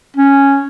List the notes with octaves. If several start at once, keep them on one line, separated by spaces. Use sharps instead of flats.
C#4